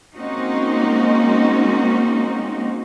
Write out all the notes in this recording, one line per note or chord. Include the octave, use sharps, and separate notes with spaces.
G#3 A#3 C4 C#4 D#4 F#4